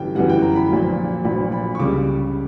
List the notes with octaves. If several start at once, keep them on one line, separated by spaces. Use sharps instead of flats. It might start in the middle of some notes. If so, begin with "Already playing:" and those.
Already playing: G1 F#2 E3 G3 G5
G1 F#2 E3 G3 F#5
G5
A#5
B5
A#1 A#2 F#3
A#1 A#2 F#3 B5
B5
C#6
C#2 C#3 G3 D6